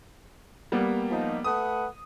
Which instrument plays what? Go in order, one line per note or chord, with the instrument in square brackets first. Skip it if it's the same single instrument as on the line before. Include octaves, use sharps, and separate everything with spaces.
[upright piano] G3 A#3 B3
[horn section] F3 D#4
[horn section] A3 B4 F#5 [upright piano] D#6